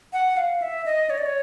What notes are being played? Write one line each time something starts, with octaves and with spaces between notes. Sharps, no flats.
F#5
F5
E5
D#5
C#5
D5
C#5